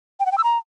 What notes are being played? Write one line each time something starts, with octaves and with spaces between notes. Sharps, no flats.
G5
F#5
G5
E6
A#5